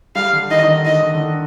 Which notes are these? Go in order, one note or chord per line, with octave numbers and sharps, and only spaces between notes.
G3 F5
D3
D#3 D#5
D#3
D3
D#3 D#5
D3
D3
D#3